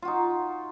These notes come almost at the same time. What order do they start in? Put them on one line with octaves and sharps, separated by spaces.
F4 F#4 D#4